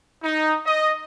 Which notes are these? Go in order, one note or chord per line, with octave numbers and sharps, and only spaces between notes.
D#4
D#5